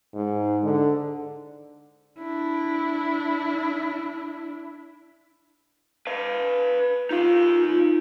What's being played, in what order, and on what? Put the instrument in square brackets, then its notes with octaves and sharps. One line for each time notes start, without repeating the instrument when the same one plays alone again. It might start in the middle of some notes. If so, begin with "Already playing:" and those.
[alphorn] G#2
D3
[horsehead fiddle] D4 E4
[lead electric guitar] B4 F5
[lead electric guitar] D#4 F5 [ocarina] F4